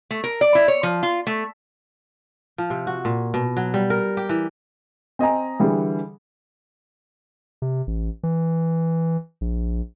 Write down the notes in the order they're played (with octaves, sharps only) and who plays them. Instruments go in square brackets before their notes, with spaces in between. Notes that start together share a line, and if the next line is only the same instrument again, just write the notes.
[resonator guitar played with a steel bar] A3
A#4
D5
E4
C#5
F3
F4
A3
[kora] F3
C3
F#4
A#2
B2
F#3
G3
A#4
G4
E3
[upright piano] C4 D#5 G#5 A#5
D3 E3 G3 G#4
[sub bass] C3
A1
E3
A#1